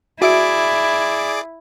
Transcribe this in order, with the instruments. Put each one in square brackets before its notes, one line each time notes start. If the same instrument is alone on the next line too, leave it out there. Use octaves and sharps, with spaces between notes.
[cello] E4 [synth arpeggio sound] F#4 E5 D7 [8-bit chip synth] G#4 D5 D6